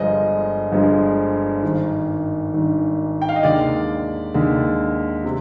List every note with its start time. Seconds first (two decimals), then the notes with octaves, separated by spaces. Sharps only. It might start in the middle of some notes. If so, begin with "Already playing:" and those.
Already playing: G1 G2 F3 G#3 D#5
0.72 G1 G2 F3 G#3
1.62 G#1 G2 D#3
2.54 G#1 G2 D#3
3.22 G5
3.29 F5
3.36 D#5
3.43 D#2 D3 G#3 D5
4.34 D#2 D3 G#3
5.24 C3